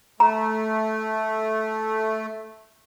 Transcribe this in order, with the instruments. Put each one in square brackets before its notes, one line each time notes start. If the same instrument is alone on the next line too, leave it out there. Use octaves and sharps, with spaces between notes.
[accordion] A3 [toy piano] A#5